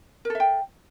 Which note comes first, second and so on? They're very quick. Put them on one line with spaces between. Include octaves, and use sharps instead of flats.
A#4 A4 E5 G5